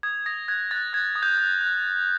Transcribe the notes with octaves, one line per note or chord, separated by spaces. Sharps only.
D#6 G#6
D#6 A#6
F#6 G#6
F#6 A6
F#6 G#6
D#6
G6
F#6
F#6